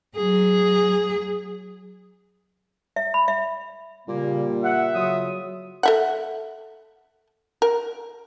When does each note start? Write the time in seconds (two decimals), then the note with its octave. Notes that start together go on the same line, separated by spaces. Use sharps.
0.16 F#3 G#4
2.96 E5
3.14 B5
3.28 E5
4.08 A#2 C#3 G3 A#3
4.63 E5 F#5
4.95 C#3 F#3 F4 D#6
5.83 A4 E5 F#5
7.62 A#4